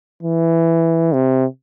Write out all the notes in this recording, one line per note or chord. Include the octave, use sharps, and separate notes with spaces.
E3
C3